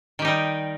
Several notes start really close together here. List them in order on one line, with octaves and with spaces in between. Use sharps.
D#3 G4 D#4 G3